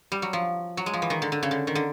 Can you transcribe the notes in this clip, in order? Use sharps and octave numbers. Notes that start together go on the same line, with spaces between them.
G3
F#3
F3
F#3
G#3
F3
E3
D#3
D3
D3
C#3
D3
D#3
D3